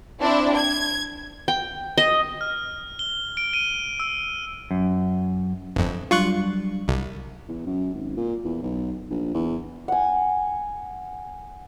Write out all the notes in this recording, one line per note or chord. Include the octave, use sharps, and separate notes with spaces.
C4 D4 E4
G#6
G5
D#5
F6
G7
D7
D#7
E6
F#2
G1 F2
F#3 G3 D4 F4 C#6 F#6
C2
E2
F#2
G#1
A#2
E2
B1
A#1
E2
F#5 G#5